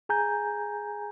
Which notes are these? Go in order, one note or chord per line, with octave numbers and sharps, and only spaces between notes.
G#4 G#5 A#5 G6